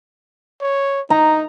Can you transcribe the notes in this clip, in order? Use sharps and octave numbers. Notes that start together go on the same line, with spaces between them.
C#5
D#4 A#5